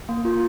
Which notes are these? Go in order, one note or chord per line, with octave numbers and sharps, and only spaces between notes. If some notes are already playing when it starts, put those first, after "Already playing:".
A#3
F4